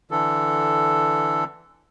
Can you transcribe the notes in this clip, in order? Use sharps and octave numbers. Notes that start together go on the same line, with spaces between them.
D3 E3 A4